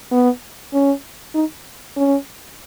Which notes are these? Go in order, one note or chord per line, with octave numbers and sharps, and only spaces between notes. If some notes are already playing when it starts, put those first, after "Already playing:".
B3
C#4
D#4
C#4